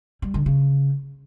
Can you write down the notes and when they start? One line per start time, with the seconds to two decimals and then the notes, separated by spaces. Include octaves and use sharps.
0.22 G3
0.34 D3
0.46 C#3